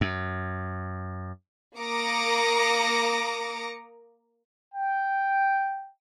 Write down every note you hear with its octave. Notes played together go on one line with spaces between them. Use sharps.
F#2
A#3 A#5 D6 D#6 A#6 C#7
G5